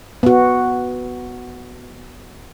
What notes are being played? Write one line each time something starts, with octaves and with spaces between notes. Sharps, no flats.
B3 F#4